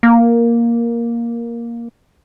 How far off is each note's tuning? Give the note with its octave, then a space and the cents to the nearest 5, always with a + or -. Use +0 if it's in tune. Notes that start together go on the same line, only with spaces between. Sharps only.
A#3 +5